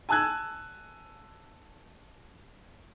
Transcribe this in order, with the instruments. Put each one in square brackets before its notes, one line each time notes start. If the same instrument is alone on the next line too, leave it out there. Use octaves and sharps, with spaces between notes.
[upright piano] G#5 A5 E6 F#6 G#6